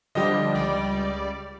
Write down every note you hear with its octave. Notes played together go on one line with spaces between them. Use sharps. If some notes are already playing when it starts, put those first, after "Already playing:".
D3 F3 G3 G4 D#5
C#2 G3 D5